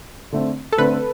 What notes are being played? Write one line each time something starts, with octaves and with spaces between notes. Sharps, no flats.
D3 A3 C4
A4
D3 A3 C4 B4